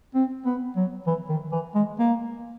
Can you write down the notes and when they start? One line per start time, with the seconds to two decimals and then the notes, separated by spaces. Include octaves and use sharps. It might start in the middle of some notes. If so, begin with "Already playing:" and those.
0.15 C4
0.46 B3
0.76 F#3
1.07 E3
1.29 D#3
1.52 E3
1.75 G#3
1.99 A#3